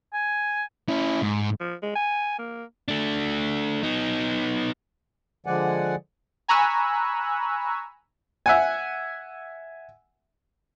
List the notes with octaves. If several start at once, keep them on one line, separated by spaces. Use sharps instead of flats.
G#5
C#4 E4
G#2
F3
G#3
G#5
A#3
A3 D4
B3 D#4
D3 F3 G#3 D5 F#5 G#5
G#5 A#5 B5 C#6 E6 F#6
E5 F#5 G#5